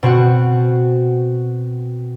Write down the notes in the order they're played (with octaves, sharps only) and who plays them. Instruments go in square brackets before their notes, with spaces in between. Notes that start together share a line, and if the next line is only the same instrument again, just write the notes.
[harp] B2 C4 F#4 F#5